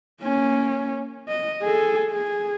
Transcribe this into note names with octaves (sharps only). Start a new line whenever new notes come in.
A#3 C#4
D#5
G#4 A4
G#4